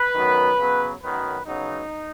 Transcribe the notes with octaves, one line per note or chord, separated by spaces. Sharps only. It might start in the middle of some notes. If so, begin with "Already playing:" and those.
Already playing: B4
F#2 D#3 F#3 B3
C#3 F#3 B3
F#2 D#3 F#3 B3 B4
C#3 F#3 B3 D#4